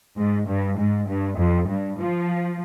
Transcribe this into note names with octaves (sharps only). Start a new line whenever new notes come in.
G#2
G2
G#2
G2
F2
G2
F3